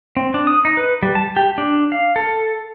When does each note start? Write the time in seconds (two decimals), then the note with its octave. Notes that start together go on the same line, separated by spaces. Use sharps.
0.17 C4
0.34 D4
0.47 D#6
0.65 D#4
0.77 B4
1.03 G3
1.15 A5
1.36 G4
1.58 D4
1.92 F5
2.16 A4